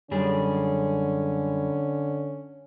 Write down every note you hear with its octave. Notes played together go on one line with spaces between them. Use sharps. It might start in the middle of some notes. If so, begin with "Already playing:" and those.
F#2 D3 G3 C#4 G#4